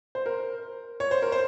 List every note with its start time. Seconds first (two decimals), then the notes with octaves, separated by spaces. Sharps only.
0.15 C5
0.26 A#4
1.00 C#5
1.11 C5
1.22 A#4
1.32 C5